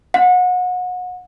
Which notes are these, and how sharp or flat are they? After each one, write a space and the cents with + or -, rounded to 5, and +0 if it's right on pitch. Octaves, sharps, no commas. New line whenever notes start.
F#5 -30